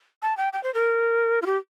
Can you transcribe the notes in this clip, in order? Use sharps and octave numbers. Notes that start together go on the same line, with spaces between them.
A5
G5
G5
C5
A#4
F4
G4